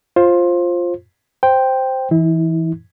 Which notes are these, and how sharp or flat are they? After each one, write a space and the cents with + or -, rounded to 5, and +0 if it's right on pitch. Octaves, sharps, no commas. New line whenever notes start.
F4 +0 C5 +20
C5 +0 G5 +0
E3 +0 E4 -35